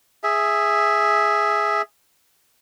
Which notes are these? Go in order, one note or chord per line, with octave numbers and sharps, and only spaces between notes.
G#4 E5